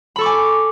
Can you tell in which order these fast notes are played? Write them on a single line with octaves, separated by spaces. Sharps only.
B5 A4 C#6 D6 G#5